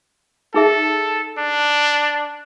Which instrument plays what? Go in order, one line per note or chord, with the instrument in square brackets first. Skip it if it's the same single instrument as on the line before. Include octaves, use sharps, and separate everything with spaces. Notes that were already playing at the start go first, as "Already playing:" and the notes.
[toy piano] D#4 G#4 E5 [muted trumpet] A4
[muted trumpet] D4